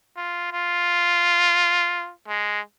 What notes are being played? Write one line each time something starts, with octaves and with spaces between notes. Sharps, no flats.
F4
F4
G#3